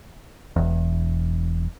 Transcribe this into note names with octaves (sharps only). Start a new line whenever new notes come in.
E1 E2